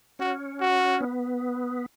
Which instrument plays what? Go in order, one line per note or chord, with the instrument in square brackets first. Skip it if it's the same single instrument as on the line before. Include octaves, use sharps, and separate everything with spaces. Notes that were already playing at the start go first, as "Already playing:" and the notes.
[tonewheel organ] C#4 [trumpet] F#4
[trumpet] F#4
[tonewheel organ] B3